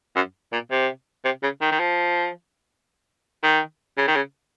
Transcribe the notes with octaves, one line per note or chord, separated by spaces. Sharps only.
F#2
A#2
C3
C3
C#3
D#3
D#3
F3
D#3
C#3
D#3
C#3